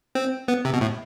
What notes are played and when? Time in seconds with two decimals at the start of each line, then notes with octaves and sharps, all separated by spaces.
0.15 C4
0.48 B3
0.65 C3
0.73 B2
0.81 A2